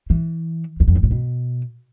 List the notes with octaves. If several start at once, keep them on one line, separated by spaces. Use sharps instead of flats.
E3
E2
F2
G2
A2
B2